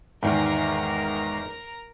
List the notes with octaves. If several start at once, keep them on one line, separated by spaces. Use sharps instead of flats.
E2 G#2 D#3 G#3 A#4 A#5